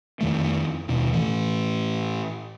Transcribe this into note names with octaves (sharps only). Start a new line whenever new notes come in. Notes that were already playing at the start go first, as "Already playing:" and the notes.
F2 D#3 A3
D#2 B2
A2 E3